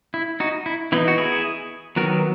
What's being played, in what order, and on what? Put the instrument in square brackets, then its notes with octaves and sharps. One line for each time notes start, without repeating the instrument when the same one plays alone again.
[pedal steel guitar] E4
D#4 F#4
E4
E3 B3 D#4 E4
F#4
E4 G#4
D#3 F#3 B3 F#4 A#4